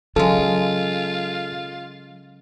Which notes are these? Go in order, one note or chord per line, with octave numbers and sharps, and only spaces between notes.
C#3 F#3 G#3 F4 A4